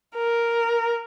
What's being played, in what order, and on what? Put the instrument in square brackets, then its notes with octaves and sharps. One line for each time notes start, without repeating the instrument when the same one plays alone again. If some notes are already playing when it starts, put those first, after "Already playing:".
[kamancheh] A#4